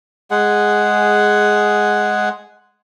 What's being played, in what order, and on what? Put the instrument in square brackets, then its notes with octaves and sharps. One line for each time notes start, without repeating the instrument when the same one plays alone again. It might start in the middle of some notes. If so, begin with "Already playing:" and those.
[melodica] G#3 G#4 F#5